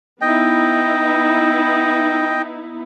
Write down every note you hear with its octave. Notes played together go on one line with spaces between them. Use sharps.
B3 D#4 E4 D#5 G5